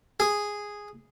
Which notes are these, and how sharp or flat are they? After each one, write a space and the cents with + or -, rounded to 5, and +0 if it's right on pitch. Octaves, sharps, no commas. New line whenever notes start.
G#4 -5